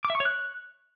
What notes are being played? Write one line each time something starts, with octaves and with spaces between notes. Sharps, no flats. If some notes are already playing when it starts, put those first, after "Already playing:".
D6
E5
C#6
C#5
F#6